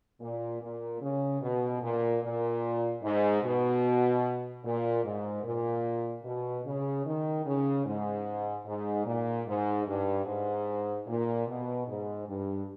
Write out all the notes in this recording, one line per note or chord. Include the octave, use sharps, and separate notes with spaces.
A#2
A#2
C#3
B2
A#2
A#2
G#2
B2
A#2
G#2
A#2
B2
C#3
D#3
C#3
G#2
G#2
A#2
G#2
G2
G#2
A#2
B2
G#2
G2